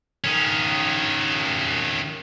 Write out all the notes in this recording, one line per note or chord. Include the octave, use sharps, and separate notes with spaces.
D#3 C#4